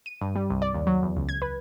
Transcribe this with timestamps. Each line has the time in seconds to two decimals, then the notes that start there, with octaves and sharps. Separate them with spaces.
0.06 D#7
0.21 G2
0.36 G3
0.50 C2
0.62 D5
0.74 D#2
0.87 F#3
1.03 E2
1.16 C#2
1.29 G#6
1.42 B4